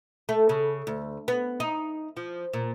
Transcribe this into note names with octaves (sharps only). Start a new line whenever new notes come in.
A3
C#3
D2
B3
D#4
F3
A#2